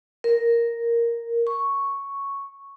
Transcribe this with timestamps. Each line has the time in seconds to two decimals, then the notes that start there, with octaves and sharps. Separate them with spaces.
0.24 A#4
1.47 C#6